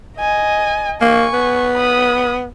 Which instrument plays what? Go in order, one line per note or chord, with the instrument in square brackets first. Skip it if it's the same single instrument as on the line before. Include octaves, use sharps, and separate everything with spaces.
[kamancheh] D#5 G#5
[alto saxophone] A#3 [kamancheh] G#5 C#6
[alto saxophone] B3
[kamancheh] B5 D#6